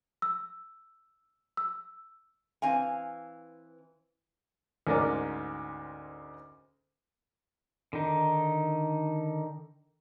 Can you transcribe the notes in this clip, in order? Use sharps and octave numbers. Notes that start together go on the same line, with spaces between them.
E6
E6
E3 C4 F5 G#5
D2 G#2 C#4 A#4 D5 D6
D3 D#3 D#4